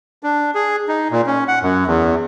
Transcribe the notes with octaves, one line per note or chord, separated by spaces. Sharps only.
D4
G#4
D#4
A#2
C#4
F#5
F#2
E2